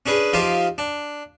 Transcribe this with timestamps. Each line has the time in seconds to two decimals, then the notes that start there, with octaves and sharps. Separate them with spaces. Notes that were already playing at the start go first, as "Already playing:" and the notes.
0.06 C#4 D4 G#4 B4
0.33 F3 D#4 F4 G4
0.78 D4